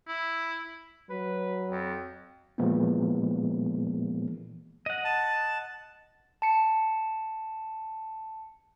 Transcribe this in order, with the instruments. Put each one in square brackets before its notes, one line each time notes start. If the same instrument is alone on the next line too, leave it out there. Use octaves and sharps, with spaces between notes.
[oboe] E4
[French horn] F#3 [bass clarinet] B4
[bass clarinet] F2
[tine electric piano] A#2 E3 F3 G#3 A#3 B3
[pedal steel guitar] D#5 F#5
[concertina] A5
[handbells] A5 C#7